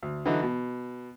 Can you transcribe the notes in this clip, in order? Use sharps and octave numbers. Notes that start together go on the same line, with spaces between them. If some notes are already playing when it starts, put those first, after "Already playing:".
D2
D3 E3 F#3 D#4 F#4
B2